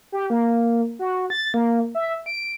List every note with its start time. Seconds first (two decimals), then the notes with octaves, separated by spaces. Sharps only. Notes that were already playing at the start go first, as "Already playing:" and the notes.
0.12 G4
0.30 A#3
0.99 F#4
1.30 A6
1.54 A#3
1.95 E5
2.26 D7